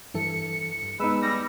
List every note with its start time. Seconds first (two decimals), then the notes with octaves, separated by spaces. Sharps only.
0.14 G2 E3 A4 C#7
0.82 G2
1.00 G#3 B3 D#4 B4 E6
1.22 G3 A#6